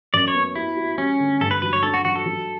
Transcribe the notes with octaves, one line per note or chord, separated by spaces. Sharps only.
F#2 D5
C#5
B3
E4 F#4
F#4
G3 C#4
D3
G2 A4
B4
F#3 B4
C#5
D4 A4
F#4
F#3 F#4
A4
F#3